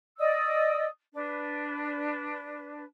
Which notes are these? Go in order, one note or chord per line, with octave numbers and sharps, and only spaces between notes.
D5 D#5 D#6 E6
D4 B4